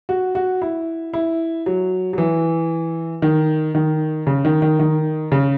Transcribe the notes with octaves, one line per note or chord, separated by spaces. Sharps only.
F#4
F#4
E4
E4
F#3
F#3
E3
D#3
D#3
C#3
D#3
D#3
D#3
C#3